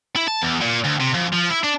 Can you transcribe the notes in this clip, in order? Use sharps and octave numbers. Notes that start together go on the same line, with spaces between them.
E4
A5
E2
A#2
D2
C3
F2
F3
E4
D4